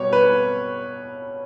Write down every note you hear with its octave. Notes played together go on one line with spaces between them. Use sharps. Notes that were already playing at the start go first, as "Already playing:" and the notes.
Already playing: B2 G3 C#5
B4